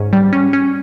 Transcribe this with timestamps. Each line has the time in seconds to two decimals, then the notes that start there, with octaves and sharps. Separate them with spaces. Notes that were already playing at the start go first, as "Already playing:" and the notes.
Already playing: G#2 C#4
0.13 G3
0.33 C#4
0.53 C#4